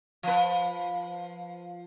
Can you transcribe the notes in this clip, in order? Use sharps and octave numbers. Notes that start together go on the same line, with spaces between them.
F3 B4